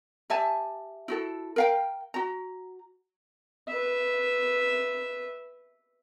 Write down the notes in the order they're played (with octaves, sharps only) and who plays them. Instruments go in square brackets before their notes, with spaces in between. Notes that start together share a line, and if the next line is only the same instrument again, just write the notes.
[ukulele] G4 E5 G#5 A5
E4 F#4 A4
A#4 F5 G5
F#4 A#5
[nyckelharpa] B4 E5